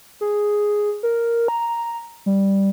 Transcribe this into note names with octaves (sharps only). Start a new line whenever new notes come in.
G#4
A#4
A#5
G3